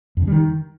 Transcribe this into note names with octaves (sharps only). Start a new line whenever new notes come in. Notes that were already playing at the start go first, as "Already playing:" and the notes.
F2
C#3
G3
D#3